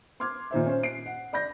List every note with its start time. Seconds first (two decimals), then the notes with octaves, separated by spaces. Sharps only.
0.20 C6 D6 F6 G#6
0.51 A#2 D#3 C5 E5
0.66 C#4 C5
0.83 C7 D7
1.06 F#5
1.33 D5 B5 G6 A#6